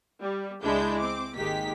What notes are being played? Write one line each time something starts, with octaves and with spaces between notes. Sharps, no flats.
G3
C#2 G#3 D4 E4 G6
C4 D6
G#1 G#3 A#3 D#4 G4 B6